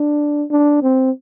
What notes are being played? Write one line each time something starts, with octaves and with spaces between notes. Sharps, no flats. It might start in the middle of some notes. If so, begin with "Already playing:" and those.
Already playing: D4
D4
C4